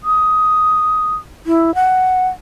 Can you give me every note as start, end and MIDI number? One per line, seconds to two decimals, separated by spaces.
0.04 1.15 87
1.46 1.74 64
1.75 2.28 78